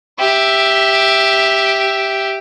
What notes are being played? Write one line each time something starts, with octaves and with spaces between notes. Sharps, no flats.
G4 E5